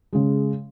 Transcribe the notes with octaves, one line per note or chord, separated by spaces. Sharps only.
C#3 G#3